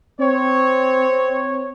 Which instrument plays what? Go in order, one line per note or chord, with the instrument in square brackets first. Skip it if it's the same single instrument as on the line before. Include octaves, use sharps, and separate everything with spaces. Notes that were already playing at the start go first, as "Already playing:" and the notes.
[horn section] C4 C#5